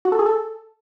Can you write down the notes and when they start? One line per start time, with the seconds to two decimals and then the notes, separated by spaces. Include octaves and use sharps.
0.05 F#4
0.12 A4
0.19 G#4
0.26 A4